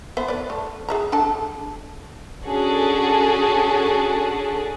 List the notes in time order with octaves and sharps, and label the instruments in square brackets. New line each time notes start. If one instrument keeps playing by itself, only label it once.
[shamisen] B3 C5 E5
B4 D5
A3
G#4 E5 A#5
D4 A4 A5
[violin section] C#4 D4 F#4 G#4 A4